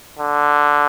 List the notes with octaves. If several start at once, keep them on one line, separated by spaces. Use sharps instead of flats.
D3